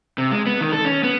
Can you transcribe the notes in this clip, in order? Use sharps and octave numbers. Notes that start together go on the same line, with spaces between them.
C3
G#3
B3
D#3
A4
C#4
B3